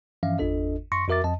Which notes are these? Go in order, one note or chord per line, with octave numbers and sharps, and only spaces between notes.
G2 E3 F3 C#4 E5 F5
G1 E2 D4 A4 D#5
F#2 C6 C#6 A#6 C#7
F2 F#4 A#4 E5 D6 A6
F2 D#5 A5